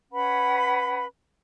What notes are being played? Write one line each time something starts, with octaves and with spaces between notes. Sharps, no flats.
C#4 B4 F#5 B5